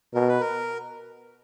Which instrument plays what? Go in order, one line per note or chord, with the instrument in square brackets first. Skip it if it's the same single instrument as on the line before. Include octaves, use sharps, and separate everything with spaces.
[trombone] B2 [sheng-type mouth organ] A#4
[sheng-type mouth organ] B4
A#4